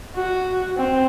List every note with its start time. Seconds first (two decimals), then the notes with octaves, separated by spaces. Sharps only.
0.16 F#4
0.77 C4